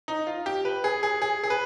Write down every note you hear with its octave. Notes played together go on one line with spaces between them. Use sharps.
D#4
F4
G4
B4
G#4
G#4
G#4
G#4
B4